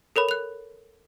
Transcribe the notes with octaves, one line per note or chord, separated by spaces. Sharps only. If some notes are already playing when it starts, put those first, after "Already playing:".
A4 A#4 C#5 B5
F#6 F7